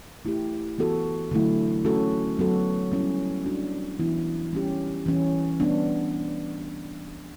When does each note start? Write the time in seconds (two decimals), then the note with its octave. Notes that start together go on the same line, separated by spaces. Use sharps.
0.25 A3 E4 G4
0.78 E3 B3 F#4 A4
1.31 D3 F#3 A3 E4
1.85 A3 C#4 F#4 A4
2.39 F#3 B3 F#4 A4
2.92 G3 C#4 E4
3.46 G3 D4 F#4
3.99 E3 B3 E4
4.53 G3 C#4 G4
5.06 E3 G3 C#4
5.60 G3 B3 D4